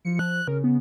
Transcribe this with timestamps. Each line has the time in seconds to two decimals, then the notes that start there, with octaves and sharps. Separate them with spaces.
0.05 F3 C#7
0.19 F3 F#6
0.48 C#3 A#4
0.64 B3